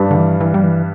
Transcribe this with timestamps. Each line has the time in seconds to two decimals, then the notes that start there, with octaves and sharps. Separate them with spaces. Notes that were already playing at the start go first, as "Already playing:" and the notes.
Already playing: G2 G3 D4 B4
0.11 D3
0.16 E3
0.41 E3
0.54 G3
0.64 E3